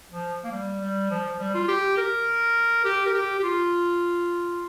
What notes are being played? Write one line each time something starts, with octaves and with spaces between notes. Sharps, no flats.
F3
A#3
G3
G3
F3
F3
G3
F4
G4
A#4
G4
A#4
G4
G4
F4